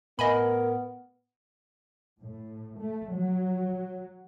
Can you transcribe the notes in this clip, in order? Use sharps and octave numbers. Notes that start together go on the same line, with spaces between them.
A2 B3 A#4 D#5 G#5 B5
A2
A3
F#3